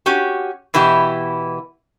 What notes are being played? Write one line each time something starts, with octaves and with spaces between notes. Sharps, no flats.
C#4 F#4 G4
B2 E3 E4 G4